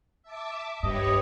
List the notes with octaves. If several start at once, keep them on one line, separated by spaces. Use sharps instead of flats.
E5 A5 D6
G2 G4 B4 C#5 D#5